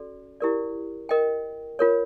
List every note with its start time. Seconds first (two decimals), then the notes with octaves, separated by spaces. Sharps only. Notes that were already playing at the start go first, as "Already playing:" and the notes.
Already playing: C#4 F#4 A4 D5
0.40 E4 G4 A#4 D5
1.09 A#4 D#5 G5
1.79 F4 A#4 C#5